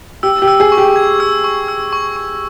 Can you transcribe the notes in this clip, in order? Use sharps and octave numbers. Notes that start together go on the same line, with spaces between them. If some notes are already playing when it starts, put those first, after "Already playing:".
G4 E6
G4
E6
G#4
C#6
G4
G#6
E6
C#6
E6
C#6
C#6